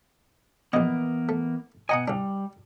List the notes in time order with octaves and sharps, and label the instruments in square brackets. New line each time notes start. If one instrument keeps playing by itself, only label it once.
[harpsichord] A#1 D#5 [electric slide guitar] E3 A#3 B3
[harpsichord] A3
[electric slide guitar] B2 F#5 G#5 [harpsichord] D#5 A#5 D#6
[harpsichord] C2 D4 [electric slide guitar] G3